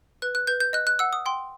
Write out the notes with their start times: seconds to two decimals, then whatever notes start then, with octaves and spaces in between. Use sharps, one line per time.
0.22 B4 F#6
0.35 F#6
0.47 B4 G6
0.60 G6
0.73 D#5 F#6
0.87 F#6
0.99 F#5 E6
1.13 D#6
1.26 G5 C6